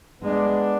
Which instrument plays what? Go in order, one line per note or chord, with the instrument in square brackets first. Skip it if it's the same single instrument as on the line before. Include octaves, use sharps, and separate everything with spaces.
[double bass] G#3 [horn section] B3 D4